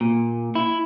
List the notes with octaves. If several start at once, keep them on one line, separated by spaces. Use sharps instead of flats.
A#2
E4